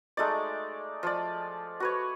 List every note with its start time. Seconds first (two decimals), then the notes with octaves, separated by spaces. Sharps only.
0.17 G#3 A3 D#4 D5
1.03 F3 D5
1.80 F#4 B4 C#5